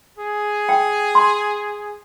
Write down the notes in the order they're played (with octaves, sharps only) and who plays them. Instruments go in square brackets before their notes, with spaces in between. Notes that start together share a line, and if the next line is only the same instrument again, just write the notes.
[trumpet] G#4
[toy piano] G5
C6